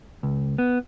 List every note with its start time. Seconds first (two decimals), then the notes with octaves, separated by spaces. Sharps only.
0.23 C#2
0.58 B3